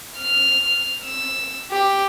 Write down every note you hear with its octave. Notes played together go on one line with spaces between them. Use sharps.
F6
E6
G4